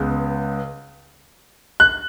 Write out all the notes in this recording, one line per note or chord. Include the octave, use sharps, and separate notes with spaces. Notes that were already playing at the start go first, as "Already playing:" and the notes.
Already playing: C#2 C#3 G#3 B3
F#6